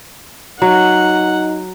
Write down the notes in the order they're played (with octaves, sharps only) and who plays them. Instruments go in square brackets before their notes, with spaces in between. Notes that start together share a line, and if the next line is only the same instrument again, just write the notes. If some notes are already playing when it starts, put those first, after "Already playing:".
[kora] F#3 [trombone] D#4 [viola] F#5